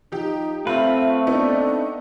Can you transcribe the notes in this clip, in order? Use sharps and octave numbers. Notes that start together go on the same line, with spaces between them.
F3 D#4 G4
A3 C4 F4 B4 E5
B3 D4 D#4